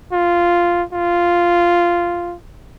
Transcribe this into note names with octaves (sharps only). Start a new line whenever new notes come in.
F4
F4